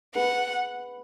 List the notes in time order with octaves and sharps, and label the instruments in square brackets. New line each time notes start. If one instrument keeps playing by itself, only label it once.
[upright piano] G#4 B4 [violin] F#5